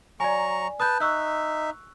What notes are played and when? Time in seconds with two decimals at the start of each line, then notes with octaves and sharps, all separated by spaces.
0.20 F#3 D5 G#5 A#5 C#6
0.80 B4 A5 D#6 G6
1.00 D#4 E5 C#6 E6 F#6